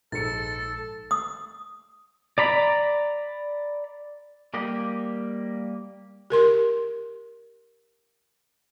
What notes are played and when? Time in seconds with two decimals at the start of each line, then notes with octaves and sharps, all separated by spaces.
0.12 A#1 G#2 A4 A6 C#7
1.11 D#6
2.38 D5 A#5 B5
4.54 G3 A#3 G4 D#5
6.30 G4 A#4 C6